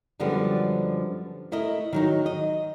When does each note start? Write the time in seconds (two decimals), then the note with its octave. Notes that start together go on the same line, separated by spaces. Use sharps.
0.20 F#2 D3 F3 G3 G#3 B3
1.52 A3 E4 A#4 D#5
1.93 D#3 F#3 D#4
2.26 D#5